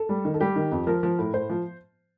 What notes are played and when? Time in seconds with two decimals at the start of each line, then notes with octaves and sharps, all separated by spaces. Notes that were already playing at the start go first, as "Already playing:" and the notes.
Already playing: A4
0.09 G3
0.25 D#3
0.34 A4
0.41 G3 G4
0.56 D#3
0.72 F2
0.87 F3 A#4
1.03 F3
1.19 A2
1.33 A2 C5
1.50 F3